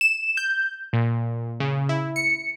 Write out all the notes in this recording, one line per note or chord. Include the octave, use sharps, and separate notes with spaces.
E7
G6
A#2
C#3
E4
C#7